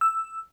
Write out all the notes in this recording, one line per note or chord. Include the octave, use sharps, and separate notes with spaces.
E6